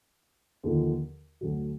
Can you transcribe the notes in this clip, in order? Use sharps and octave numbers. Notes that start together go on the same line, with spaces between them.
D#2 D3 F3
D2 D3 F#3